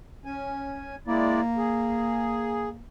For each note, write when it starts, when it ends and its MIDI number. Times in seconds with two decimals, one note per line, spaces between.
0.25 0.95 61
0.25 0.95 80
1.07 1.41 56
1.07 2.85 58
1.07 1.41 64
1.07 1.41 74
1.57 2.69 68